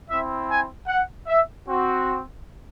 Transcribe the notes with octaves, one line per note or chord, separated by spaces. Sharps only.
C4 E4 E5
G#5
F#5
E5
C4 F#4